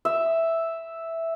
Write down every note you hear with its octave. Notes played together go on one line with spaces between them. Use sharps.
E5